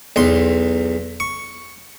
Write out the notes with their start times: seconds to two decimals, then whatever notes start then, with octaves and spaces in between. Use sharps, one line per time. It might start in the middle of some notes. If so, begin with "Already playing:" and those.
0.16 B1 E2 C6
1.20 C#6